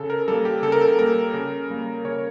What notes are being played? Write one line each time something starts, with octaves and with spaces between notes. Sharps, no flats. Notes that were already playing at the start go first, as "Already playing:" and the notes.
Already playing: C#3 A4
A#4
G3 A#3 A4
G4
C#3 A4
A#4
A4
G3 A#3 A#4
C#3
G3 A#3
C#3 C#5